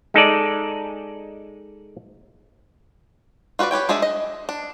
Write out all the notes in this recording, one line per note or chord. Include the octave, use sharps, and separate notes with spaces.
G#3 D#4 A4 D5
F4 F#4 B4 C#5 D5
G4 B4 C#5 G5
G#3 D4 G#4 D5 E5
D#5
D4